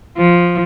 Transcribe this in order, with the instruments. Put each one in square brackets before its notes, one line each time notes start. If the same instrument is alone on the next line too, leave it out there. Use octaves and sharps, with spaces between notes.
[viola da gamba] F3